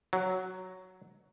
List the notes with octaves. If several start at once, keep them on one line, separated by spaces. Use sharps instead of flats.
F#3